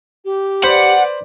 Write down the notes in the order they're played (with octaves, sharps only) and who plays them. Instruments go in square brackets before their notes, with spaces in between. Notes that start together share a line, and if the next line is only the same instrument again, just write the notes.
[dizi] G4
[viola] B4 D5 [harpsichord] C5 B5 [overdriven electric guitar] F#5